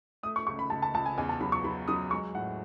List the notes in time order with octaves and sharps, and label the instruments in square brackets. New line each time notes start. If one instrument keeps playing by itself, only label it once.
[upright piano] A3 [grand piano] D#6
[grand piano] C#6
[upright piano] C#2 [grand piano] C#6
[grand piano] B5
[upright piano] C#2 [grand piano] A5
[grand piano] A5
[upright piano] C#2 [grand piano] A5
[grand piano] G#5
[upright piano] E2 [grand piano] G#5
[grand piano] A5
[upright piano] F#3 [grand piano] B5
[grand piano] C#6
[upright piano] F#3 [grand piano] B5
[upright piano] F#3 [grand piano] D#6
[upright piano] G#3 [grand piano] C#6
[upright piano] A2 [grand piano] F#5